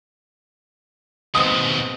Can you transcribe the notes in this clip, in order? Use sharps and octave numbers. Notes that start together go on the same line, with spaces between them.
D#2 B2 G#3 B3 C4 D#6